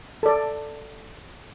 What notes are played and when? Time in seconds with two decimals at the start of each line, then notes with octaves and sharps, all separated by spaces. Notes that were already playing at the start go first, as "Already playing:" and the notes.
0.23 A4 D5